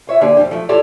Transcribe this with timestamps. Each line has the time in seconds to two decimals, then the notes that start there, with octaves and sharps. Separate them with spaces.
0.07 F4 C#5 E5
0.21 D3 A#3 D4 G4 G#5
0.37 F2 A#2 G3 G4
0.50 E3 F3 A3
0.69 E4 F4 G4 A4 C#5 D5